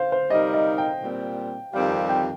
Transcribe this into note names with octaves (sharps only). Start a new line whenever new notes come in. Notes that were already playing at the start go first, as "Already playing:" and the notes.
Already playing: C5 F5
C5
C3 G3 D#4 A#4 D#5
D#5
G5
A#2 G3 C4
F2 D#3 G3 C4 G4 F5
G5
G5